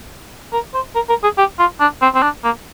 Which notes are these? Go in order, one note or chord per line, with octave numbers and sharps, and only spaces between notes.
A#4
C5
A#4
A#4
G#4
G4
F4
D4
C4
C4
D4
A#3